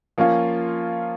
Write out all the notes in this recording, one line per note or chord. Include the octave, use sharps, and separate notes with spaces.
F3 A#3 C#4 F4